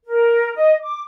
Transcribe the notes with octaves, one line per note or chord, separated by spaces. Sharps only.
A#4
D#5
D6